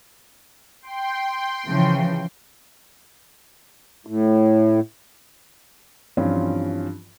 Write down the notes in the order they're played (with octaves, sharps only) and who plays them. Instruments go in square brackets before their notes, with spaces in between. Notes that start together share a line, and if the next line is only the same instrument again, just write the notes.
[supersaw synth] G5 C6
[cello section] C#3 E3 F3
[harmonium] A2
[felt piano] G2 E3 F3 C4 C#4 F4